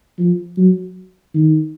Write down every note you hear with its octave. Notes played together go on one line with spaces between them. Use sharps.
F3
F#3
D#3